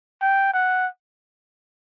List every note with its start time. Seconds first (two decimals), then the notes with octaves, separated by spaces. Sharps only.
0.21 G5
0.54 F#5